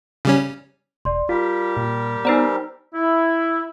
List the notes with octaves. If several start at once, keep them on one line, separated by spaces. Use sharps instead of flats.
C#3 G3 C#4
E1 D5 C6
G3 F4 G4 A#4 B6
A#2
B3 D#4 C5 D5 A#5 E6
E4